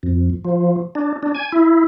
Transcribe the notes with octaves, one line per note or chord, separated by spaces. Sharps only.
F2
F3
D4
D4
G#5
E4